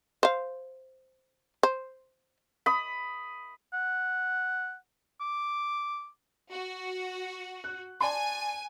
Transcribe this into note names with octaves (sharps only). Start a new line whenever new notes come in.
C5 F5
C5
B5 D#6
F#5
D6
F#4
F#6
D5 G#5 A5 C6